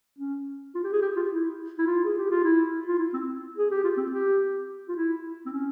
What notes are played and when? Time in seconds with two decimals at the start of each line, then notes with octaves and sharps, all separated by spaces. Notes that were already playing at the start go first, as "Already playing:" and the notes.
0.18 C#4
0.75 F4
0.84 G4
0.93 G#4
1.02 G4
1.16 F4
1.31 E4
1.78 E4
1.87 F4
2.05 G#4
2.18 G4
2.30 F4
2.44 E4
2.88 F4
2.99 E4
3.14 C4
3.57 G#4
3.71 G4
3.84 F4
3.97 C4
4.12 G4
4.89 F4
4.96 E4
5.46 C4
5.53 C#4